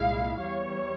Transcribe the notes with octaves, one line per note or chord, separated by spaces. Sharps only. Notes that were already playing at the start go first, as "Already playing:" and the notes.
Already playing: C2 A#2 G#3 E4 F5
E2 E3 G3 C#5